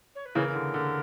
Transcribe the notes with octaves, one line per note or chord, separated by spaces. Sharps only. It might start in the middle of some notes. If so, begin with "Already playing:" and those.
C#5
B4
C#3 E3 A#4
D3
D3